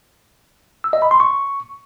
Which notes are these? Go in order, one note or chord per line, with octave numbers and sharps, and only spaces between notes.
E6
D#5
B5
C6
C#6